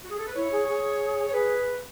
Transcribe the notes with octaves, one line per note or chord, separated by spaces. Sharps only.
F#4
G#4
A4
B4
E4 C#5
G#4
G#4
C#5
G#4 B4